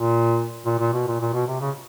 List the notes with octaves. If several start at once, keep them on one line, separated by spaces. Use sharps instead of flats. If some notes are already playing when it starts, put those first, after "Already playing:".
Already playing: A#2
A#2
A#2
B2
A#2
A#2
B2
C3
C#3